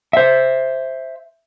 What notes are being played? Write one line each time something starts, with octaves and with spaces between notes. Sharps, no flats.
C5 E5